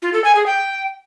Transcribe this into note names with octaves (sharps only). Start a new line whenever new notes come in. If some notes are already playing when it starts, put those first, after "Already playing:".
F4
A4
G#5
G#4
G5